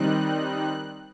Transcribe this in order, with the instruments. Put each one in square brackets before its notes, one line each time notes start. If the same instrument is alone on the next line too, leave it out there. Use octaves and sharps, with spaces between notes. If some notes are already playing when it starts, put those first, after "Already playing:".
Already playing: [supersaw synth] D#3 G3 C4 D#4 F#6